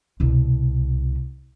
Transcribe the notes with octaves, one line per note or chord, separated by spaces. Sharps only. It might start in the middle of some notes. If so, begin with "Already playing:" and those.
C2 B2